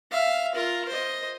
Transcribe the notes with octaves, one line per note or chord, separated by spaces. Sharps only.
E5 F5
F4 A#4
C5 D#5